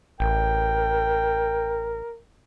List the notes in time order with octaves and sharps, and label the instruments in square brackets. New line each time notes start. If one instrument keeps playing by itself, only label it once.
[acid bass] A1 [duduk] A#4 [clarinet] G5